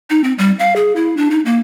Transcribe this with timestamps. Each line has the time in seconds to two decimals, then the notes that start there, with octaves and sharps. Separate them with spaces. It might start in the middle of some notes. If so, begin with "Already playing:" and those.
0.10 D#4
0.24 C4
0.38 G3
0.59 F5
0.76 G#4
0.96 E4
1.17 D4
1.31 D#4
1.46 A#3